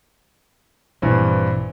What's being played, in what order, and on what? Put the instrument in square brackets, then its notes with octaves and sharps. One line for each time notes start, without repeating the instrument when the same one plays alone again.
[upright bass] A#1 [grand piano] G2 E3 C4